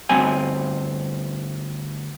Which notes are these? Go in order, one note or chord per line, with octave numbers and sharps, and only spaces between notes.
D2 G2 C4 G#5